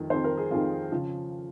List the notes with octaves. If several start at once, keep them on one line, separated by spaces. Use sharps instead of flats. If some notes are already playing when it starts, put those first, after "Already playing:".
Already playing: F2 D#3
F2 D#3 C5
A#4
G#4
F2 D#3 F4
C#3 F3